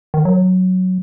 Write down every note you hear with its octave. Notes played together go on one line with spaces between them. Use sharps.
D#3
F#3